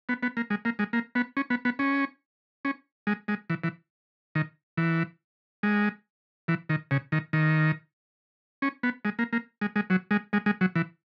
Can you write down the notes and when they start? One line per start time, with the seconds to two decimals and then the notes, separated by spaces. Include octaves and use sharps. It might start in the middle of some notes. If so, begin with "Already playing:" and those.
0.09 B3
0.23 B3
0.37 A#3
0.50 G#3
0.65 A#3
0.79 G#3
0.93 A#3
1.15 B3
1.37 C#4
1.50 B3
1.65 B3
1.79 C#4
2.65 C#4
3.07 G#3
3.28 G#3
3.50 E3
3.64 E3
4.35 D#3
4.77 E3
5.63 G#3
6.48 E3
6.69 D#3
6.91 C#3
7.12 D#3
7.33 D#3
8.62 C#4
8.83 B3
9.05 G#3
9.19 A#3
9.33 A#3
9.61 G#3
9.76 G#3
9.90 F#3
10.11 G#3
10.33 G#3
10.46 G#3
10.61 F#3
10.75 E3